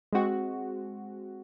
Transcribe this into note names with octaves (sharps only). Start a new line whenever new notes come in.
G#3 C4 F#4